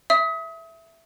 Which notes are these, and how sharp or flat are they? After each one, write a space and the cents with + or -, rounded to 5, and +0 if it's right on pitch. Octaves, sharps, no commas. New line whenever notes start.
E5 +5 D#6 +35